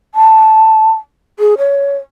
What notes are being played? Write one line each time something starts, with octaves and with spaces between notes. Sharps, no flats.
A5
G#4
C#5